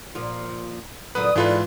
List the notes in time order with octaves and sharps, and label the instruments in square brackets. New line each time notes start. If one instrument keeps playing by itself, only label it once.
[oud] A#2 F3 F4
[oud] F#2 A#2 D3 [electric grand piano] B4 [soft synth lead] D#6
[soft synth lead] G#2 [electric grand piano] E3 F4 B4 [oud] D4 G#4 A4